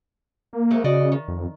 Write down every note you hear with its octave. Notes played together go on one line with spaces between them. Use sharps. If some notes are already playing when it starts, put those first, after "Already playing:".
A#3
F2 G#3 A3
C#3 F#4 D5 D#5
D#3
F2